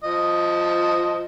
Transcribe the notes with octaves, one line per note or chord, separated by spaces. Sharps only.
F3 D#5